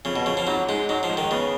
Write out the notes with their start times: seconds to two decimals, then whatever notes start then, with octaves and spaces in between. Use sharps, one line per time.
0.05 F2 C#3
0.16 B2
0.26 F2 C#3
0.37 F3
0.47 G#2 F#3
0.69 G#2 G#3
0.89 F#3 D#4
1.03 F3
1.10 G#3
1.17 D#3
1.31 C#3 B3